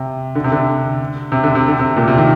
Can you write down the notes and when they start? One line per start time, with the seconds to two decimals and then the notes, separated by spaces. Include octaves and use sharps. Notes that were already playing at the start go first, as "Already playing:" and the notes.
Already playing: C3
0.35 D3
0.44 C3
0.52 D3
1.32 C3
1.43 D3
1.55 C3
1.68 D3
1.79 C3
1.97 A#2
2.08 C3
2.18 D#3